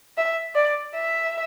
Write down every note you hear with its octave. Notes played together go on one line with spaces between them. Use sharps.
E5
D5
E5